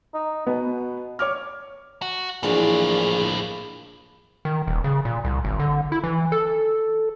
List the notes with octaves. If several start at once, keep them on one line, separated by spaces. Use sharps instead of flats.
D#4
B2 B3
C#5 D6 F6
F#4
A#1 A2 E3 F#3 D4 F4 G#4
D#3
D#1
C#3
A#2
C2
G#1
D3
E4
E3
A4